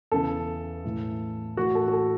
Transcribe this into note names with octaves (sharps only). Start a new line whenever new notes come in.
E2 C#3 E3 A4
A2 E3
A2 E3 F#4
A4
F#4
A4